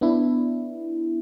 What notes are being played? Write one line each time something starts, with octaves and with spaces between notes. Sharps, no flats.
B3 D4 E4